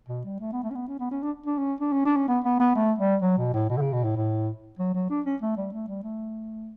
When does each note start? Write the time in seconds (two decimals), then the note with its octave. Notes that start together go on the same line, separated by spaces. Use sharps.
0.09 B2
0.25 G3
0.40 A3
0.52 B3
0.64 A3
0.71 C#4
0.75 B3
0.88 C#4
0.99 B3
1.11 C#4
1.23 D4
1.46 D4
1.58 C#4
1.81 D4
1.92 C#4
2.05 D4
2.16 C#4
2.28 B3
2.44 B3
2.60 B3
2.76 A3
2.99 G3
3.22 F#3
3.38 B2
3.54 A2
3.70 B2
3.77 D3
3.82 C#3
3.93 B2
4.04 A2
4.16 A2
4.79 F#3
4.94 F#3
5.10 D4
5.26 C#4
5.42 A3
5.57 G3
5.73 A3
5.88 G3
6.04 A3